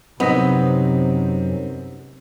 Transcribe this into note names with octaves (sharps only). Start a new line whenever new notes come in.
F#2 C3 B3 C4 D#4 D#5 B6